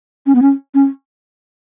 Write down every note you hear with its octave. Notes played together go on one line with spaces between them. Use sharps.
C#4
B3
C#4
C#4